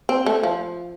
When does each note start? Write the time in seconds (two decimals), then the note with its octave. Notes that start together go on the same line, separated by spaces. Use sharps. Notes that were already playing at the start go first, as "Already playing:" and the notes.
0.09 C4
0.26 A3
0.43 F3